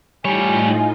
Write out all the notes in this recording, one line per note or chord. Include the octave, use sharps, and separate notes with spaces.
A2 G3 D#4 F4 G4 C#5 G#5